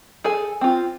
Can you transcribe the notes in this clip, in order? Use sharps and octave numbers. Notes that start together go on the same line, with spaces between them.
G#4 A4 G#5
C4 F4